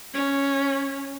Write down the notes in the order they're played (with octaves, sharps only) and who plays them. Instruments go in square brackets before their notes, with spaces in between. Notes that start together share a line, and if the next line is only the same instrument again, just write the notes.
[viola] C#4